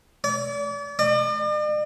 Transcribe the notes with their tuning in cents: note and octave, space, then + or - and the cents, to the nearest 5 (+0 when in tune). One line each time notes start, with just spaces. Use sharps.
D5 -40
D5 +45